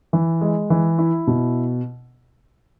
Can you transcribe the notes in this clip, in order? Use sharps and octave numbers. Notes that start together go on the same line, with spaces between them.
E3
G#3
E3
E4
B2